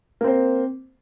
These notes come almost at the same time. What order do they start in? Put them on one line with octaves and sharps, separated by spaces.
A#3 C4 C5